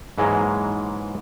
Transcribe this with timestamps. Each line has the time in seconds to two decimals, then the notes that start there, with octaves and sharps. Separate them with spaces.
0.18 G#2 E3 F#3 G#3 A#3